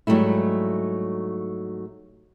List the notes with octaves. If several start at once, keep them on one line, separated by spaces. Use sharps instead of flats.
G#2 F#3 G3 A3 E4